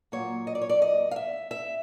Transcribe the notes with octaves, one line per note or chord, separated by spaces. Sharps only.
A#2 F#3 A#3 C#5
D#5
D5
C#5
D5
D#5
F5
E5
E5